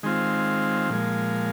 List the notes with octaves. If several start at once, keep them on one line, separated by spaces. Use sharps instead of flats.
D#3 G#3 C4 F4
A#2 F3 G#3